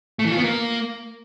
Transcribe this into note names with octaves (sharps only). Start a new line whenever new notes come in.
A3
E3
F4
B3
A#3